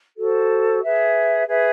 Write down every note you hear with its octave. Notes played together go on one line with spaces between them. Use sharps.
F#4 A4 C5
G#4 B4 E5
G#4 B4 E5